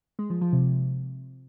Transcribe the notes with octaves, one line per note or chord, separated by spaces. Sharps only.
G#3
F3
F3
C3